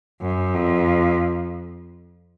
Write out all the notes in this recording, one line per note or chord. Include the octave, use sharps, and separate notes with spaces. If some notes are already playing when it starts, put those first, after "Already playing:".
F#2
F2